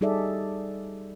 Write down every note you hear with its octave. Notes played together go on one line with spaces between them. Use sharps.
G3 D#4 G#4 A4 D5 E5